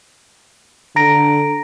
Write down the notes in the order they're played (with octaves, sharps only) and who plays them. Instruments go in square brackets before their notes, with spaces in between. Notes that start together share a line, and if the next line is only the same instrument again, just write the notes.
[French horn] D3 [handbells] A#5 A#6 D7